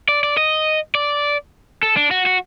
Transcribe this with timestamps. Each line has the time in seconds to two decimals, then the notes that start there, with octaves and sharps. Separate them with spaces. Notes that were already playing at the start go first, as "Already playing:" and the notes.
0.08 D5
0.23 D5
0.37 D#5
0.95 D5
1.83 A4
1.97 D4
2.11 F#4
2.26 F#4